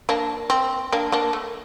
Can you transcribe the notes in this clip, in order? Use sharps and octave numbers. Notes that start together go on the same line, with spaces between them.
A#3 D4
C4
A#3 D4
A#3 D4
A3